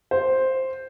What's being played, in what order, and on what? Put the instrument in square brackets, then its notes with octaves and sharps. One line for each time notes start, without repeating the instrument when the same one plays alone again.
[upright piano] C5